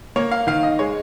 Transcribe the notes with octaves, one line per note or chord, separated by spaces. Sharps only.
A#3 C#5
F5
D#3 F5
D#5
G#3 C#5